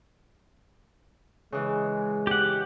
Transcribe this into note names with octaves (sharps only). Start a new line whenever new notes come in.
C#3 E3 G#3
G4 F#5